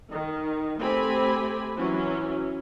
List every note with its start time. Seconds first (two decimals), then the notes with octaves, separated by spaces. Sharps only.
0.10 D#3
0.78 A3 C4 G4 G#5 B5
1.76 E3 F#3 C#4